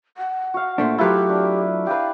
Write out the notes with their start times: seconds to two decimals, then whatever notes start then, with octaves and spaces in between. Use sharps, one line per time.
0.17 F#5
0.54 F#4 F5
0.78 A#2 A3 D4 C5 E5
0.98 F#3 A3 E4 F4 G4 A#4 B4
1.29 D4
1.87 G4 B4 F5